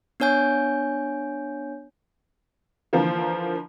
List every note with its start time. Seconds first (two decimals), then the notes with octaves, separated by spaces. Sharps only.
0.20 B3 D4 C#5 G#5 G6
2.93 D3 E3 F3 A#3